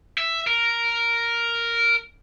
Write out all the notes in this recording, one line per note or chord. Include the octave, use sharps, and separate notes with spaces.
E5
A#4